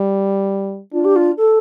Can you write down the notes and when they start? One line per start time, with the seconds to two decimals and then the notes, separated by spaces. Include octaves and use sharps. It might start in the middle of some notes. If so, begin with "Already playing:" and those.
Already playing: G3
0.93 D4 F4
1.04 G4
1.16 F4
1.37 A4